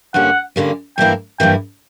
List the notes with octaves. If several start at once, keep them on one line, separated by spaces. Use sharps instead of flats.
G2 D3 A#3 C#4 G4 F#5
G2 D3 A#3 C#4 G4
G2 E3 A#3 E4 G5
G2 E3 A#3 E4 G5